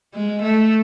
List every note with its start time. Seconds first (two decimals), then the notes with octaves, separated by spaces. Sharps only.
0.14 G#3
0.42 A3